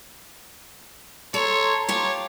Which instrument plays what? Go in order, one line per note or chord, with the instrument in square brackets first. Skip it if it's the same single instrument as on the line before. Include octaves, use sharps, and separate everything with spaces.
[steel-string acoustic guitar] A4 [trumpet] C#5 [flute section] A#5 C6
[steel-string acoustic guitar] F4 G4 [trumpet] C#5